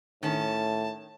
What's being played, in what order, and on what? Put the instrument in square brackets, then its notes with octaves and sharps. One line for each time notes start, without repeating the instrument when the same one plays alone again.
[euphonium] A2 [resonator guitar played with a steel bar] D#3 C#4 [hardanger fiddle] A5